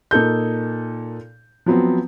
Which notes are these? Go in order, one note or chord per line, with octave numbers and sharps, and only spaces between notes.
A#2 D#4 A4 G6
F3 F#3 B3 C4